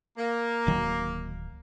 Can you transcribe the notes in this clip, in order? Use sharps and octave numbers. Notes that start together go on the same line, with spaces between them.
A#3
D1 D#3 F#3